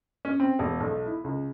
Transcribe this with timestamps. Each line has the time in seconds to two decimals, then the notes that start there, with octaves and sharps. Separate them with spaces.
0.25 C#4
0.40 C4
0.59 E1
0.80 B1
1.06 E4
1.24 C#2